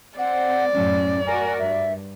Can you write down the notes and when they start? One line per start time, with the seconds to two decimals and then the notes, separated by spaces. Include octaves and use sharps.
0.19 C4 D5 F#5
0.75 F#2 A2 F#3 C#4
1.27 F#4 A#4 G#5
1.59 G2 E5